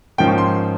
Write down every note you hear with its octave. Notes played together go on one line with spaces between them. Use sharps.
G#2 F3 A#3 C#4 G5
C#6
C6